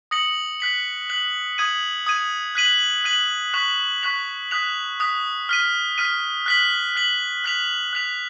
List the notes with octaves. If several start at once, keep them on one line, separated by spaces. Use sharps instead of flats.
D#6 A#6 C#7 F#7
F#6 B6 F#7
F#6 B6 F#7
D#6 G#6 D#7
D#6 G#6 D#7
F#6 B6 D#7 F#7
F#6 B6 D#7 F#7
C#6 F#6 B6 F7
C#6 F#6 B6 F7
D#6 F#6 B6 F7
D#6 F#6 B6 F7
F6 B6 D#7
F6 B6 D#7
F#6 B6 F#7
F#6 B6 F#7
F#6 B6 F7
F#6 B6 F7